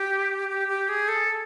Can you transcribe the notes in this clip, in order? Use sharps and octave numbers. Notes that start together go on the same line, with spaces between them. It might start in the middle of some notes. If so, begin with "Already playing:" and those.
Already playing: G4
G4
G4
G#4
A4